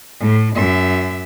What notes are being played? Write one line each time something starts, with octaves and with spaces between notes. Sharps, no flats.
A2
F#2 E5